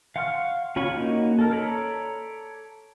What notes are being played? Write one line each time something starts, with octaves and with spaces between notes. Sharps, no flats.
F5 F#5 C6 C#6 F6
C#4 F4 C#5 B5 C#6
A#3 C#4 D#4 F#4
A4 A#4
A4 C#5 D5 A#5 B5